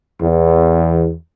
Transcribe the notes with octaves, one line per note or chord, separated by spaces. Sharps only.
E2